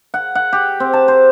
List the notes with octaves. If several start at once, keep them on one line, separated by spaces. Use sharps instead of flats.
F#5
F#5
G4
C4
A5
C5